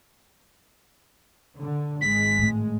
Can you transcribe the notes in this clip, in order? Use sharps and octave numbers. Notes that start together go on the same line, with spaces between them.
D3
G#1 G#3 B6
A2 A3